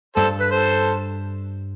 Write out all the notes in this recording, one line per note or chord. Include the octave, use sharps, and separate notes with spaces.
G2 A4 C5
B4
A4 C5